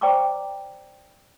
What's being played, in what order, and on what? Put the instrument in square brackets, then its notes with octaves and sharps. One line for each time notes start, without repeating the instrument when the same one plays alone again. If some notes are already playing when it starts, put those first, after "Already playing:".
[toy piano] C5 D5 G5 A#5 C#6 D6